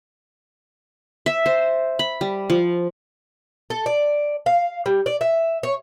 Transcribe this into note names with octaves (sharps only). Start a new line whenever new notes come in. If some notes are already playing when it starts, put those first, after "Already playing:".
E5
C5
B5
G3
F3
A4
D5
F5
G3
D5
E5
C#5